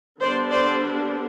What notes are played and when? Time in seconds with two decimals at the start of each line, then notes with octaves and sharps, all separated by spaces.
0.22 D3 G3 B3 D4 C5 D5
0.51 C5 D5